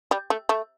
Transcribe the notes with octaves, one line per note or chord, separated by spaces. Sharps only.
G3
A3
A3